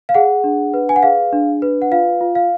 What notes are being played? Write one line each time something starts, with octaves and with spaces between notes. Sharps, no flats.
F5
G#4 F#5
D4
B4
G#5
F#5
G#4 F5
D4
B4
F#5
F4 F5
F4
F5